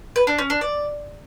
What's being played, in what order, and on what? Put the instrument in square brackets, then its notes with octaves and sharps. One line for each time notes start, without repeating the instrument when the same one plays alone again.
[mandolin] B4
D4
C#4
D4
D5